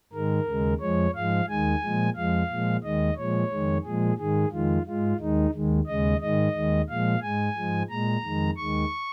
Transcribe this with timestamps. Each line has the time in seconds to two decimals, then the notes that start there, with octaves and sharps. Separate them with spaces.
0.13 G#2 D#3 G#3 A#4
0.47 D#2 C#3 G#3
0.80 F2 F3 G#3 C#5
1.14 G#2 F3 G#3 F5
1.48 D#2 D#3 G#3 G#5
1.82 A#2 F3 G#3
2.15 F2 F3 G#3 F5
2.50 A#2 F3 G#3
2.84 D#2 D#3 G#3 D#5
3.17 A#2 F3 G#3 C#5
3.50 F2 D#3 G#3
3.84 A#2 F3 G#3 G#4
4.18 G#2 D#3 G#3 G#4
4.52 F2 D#3 G#3 F4
4.86 G#2 G#3 F4
5.19 D#2 D#3 G#3 D#4
5.54 D#2 D#3 G#3
5.87 D#2 C#3 G#3 D#5
6.21 G#2 D#3 G#3 D#5
6.55 D#2 D#3 G#3
6.89 A#2 F3 G#3 F5
7.22 G#2 G#3 G#5
7.56 G#2 F3 G#3
7.90 A#2 G#3 A#5
8.24 F2 D#3 G#3
8.57 D#2 D#3 G#3 C#6